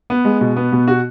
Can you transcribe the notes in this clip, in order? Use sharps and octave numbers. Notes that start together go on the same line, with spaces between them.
B3
G#3
B2
B3
B2
F#4